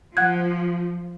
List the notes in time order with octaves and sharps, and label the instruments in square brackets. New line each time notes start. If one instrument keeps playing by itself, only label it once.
[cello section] F3 [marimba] F#5 F#6 G#6